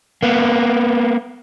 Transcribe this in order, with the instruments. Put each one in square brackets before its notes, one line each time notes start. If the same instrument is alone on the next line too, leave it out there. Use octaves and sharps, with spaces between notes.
[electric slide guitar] A#3 B3